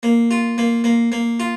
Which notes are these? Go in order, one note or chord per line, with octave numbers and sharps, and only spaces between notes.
A#3
F4
A#3
A#3
A#3
F4